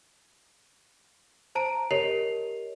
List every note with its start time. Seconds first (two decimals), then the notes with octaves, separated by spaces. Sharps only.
1.55 C5 A5 A#5 D7
1.91 G4 A#4 C#5 D#5 C7 F7